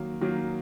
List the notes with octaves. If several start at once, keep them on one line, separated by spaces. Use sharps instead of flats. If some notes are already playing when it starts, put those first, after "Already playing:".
Already playing: D#3 F#3 A#3
D#3 F#3 A#3